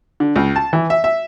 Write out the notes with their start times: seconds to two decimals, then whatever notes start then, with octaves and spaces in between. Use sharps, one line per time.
0.20 D3
0.36 C#2
0.56 A5
0.73 E3
0.90 E5
1.04 E5